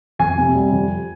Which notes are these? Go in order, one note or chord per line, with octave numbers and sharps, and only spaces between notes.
F2 G#5
C3
G3
F2